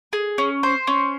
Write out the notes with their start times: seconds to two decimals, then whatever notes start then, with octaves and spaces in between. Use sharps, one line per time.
0.13 G#4
0.38 C#4
0.63 C5
0.87 C#4